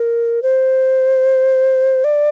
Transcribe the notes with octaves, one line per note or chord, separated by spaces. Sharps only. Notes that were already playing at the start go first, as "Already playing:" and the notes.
Already playing: A#4
C5
D5